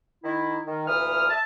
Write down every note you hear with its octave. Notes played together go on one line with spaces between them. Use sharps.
D#3 E4
D#3
D2 A#2 E3 D#6 F6
E5 A5